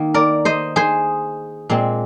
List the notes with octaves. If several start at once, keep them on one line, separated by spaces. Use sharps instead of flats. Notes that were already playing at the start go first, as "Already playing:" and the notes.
Already playing: D#3 A#3
A#4 D5
C5 D#5
G#4 C5
A#2 G#3 C4